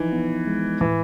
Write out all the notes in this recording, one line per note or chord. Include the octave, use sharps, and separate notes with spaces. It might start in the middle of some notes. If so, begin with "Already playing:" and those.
Already playing: E3 F3 D#4
B3
G#3
A2 E3